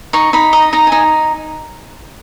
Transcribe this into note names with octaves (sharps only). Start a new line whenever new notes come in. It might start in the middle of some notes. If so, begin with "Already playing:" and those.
D#4 C#6
D#4 B5
D#5 A#5
D#4 A#5
G#5
D#4